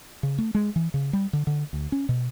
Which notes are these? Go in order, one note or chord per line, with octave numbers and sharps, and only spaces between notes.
C#3
A3
G#3
E3
C#3
G3
D3
D3
D2
C#4
B2